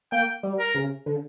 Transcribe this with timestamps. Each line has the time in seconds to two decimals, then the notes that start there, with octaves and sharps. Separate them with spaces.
0.12 A#3 G5
0.43 G3
0.59 A#4
0.75 C#3
1.06 D3